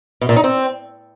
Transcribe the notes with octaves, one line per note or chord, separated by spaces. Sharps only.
B2
A#2
D#4
C4